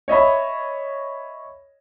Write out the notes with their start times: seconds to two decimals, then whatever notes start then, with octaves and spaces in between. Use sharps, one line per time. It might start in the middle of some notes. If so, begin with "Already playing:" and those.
0.08 C#5 D#5 E5 B5